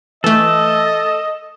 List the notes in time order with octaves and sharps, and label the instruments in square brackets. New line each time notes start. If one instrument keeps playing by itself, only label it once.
[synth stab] E3 A3 [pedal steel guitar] A4 [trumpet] D#5